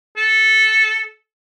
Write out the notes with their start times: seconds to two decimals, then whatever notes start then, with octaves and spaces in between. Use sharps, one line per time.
0.17 A4